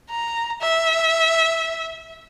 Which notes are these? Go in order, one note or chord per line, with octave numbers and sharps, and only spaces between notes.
A#5
E5